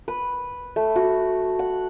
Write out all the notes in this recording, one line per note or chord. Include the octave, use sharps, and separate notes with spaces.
B4
A3
F#4
F#5